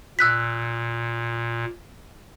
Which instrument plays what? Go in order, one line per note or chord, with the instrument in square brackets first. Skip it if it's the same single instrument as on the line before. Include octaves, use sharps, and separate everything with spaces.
[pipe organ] A#2 [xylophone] E6 F#6 B6